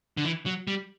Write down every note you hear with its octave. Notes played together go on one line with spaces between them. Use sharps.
D3
E3
F#3
G3